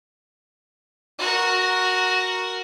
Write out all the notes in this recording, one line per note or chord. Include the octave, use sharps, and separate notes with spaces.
F#4 A#4